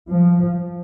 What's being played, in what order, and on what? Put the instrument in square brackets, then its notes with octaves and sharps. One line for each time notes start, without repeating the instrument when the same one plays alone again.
[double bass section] F3